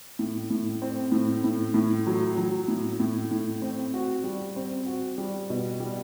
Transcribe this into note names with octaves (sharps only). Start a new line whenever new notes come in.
A2
A2
C4
A2
A2
A2
F#3
F#3
A2
A2
A2
C4
F#4
G3
C4
F#4
G3
B2
G3